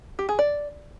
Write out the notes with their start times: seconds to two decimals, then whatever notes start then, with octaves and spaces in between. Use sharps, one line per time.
0.19 G4
0.29 G#4
0.39 D5